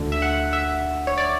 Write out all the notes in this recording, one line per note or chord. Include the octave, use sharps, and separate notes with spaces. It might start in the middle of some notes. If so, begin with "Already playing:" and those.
Already playing: D2 D3
E5
F#5
E5
C#5
D5